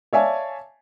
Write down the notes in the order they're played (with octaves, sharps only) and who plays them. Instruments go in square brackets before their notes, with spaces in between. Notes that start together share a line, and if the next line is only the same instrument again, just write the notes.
[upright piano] C#5 D5 E5 F5 G#5 A5